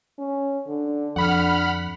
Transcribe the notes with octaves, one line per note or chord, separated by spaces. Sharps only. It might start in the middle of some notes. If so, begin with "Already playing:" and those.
C#4
D3
F2 D3 F#5 B5 F6